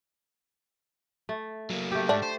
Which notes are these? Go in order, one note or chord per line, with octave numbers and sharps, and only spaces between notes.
A3
F#3 A#3
A3 G4
G#2 A3 D4
C5